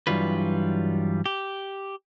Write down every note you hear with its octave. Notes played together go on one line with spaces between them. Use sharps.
G2 E3 F#3 G3 F4 B4
G4